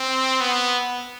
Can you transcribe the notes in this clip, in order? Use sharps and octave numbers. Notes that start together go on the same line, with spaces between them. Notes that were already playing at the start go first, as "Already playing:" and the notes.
Already playing: C4
B3